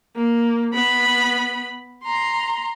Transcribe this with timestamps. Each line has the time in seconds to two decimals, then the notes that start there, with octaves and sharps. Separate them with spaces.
0.16 A#3
0.74 B3 B5
2.04 A#5 C6